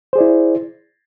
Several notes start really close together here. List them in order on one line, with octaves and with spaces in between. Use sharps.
C5 G#4 D5 E4